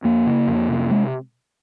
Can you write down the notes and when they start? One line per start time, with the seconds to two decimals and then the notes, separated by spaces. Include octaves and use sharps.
0.04 F2 A#3
0.27 C#3
0.47 F2
0.69 C3
0.91 G#3